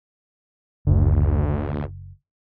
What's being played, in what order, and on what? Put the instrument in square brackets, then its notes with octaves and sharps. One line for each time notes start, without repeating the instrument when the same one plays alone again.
[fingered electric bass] F#1 [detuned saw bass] D2